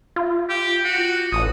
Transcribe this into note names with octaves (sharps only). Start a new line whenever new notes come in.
F4
G4
F#4
A1 D#6